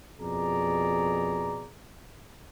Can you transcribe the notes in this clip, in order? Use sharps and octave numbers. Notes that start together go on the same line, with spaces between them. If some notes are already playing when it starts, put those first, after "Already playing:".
F2 B2 G#4 D5 A#5